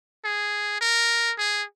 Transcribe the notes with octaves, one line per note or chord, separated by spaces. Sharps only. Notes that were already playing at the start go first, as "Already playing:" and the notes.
G#4
A#4
G#4